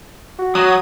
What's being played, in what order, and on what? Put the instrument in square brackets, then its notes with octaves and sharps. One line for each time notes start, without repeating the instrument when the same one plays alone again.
[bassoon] F#4
[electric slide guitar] F#3 [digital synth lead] D#6